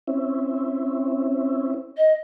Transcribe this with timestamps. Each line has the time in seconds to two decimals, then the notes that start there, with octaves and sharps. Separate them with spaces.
0.07 C4 C#4 E4
1.97 D#5